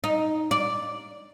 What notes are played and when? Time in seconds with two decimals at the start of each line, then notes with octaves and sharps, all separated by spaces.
0.04 D#4
0.51 D5